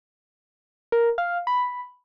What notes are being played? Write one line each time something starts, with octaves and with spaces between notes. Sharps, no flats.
A#4
F5
B5